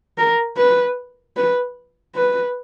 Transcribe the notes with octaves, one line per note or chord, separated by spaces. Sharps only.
A#4
B4
B4
B4